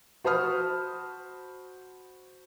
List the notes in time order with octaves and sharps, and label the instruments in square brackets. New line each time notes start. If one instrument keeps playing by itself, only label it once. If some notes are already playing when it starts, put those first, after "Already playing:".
[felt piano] F#4 C5 A5 B5 D#6 F6